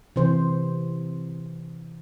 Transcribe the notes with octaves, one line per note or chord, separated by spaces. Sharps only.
C3 E3 C5